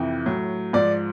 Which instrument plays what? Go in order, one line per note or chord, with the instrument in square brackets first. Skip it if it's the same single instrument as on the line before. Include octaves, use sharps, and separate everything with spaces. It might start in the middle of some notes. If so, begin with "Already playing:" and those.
Already playing: [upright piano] F2 C3 E3
A2 F#3
G#2 F3 D5